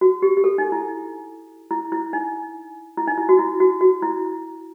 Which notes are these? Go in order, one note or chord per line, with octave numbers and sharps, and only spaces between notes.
F#4
G4
G4
A4
D#4
E4
E4
E4
D#4
E4
D#4
E4
F#4
E4
F#4
F#4
E4